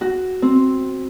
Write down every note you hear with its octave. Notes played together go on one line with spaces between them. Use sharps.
F#4
C4